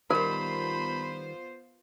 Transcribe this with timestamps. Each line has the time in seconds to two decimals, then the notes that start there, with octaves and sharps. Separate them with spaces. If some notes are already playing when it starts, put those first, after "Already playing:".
0.11 D#3 G3 B3 F4 A#4 C5 B5